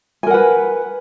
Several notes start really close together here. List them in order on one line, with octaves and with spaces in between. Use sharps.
G#5 A#4 F#5 B4